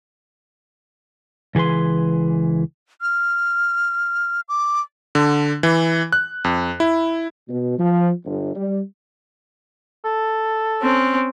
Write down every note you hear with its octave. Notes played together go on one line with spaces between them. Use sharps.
C#2 E3 G#4 B4 C6
F6
D6
D3
E3
F#6
F2
E4
B2
F3
G1
G3
A4
C4 C#4